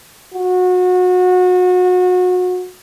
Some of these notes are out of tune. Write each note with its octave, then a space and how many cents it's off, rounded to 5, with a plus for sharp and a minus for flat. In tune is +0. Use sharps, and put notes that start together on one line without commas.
F#4 -30